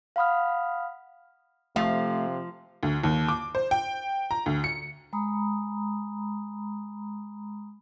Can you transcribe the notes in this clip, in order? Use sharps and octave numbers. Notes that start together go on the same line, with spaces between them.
F5 F#5 B5 D#6 F6
C3 F3 A3 F5
D2
D#2
D6
C5
G5
A#5
D2
C#7
G#3 A#5 B5 D#6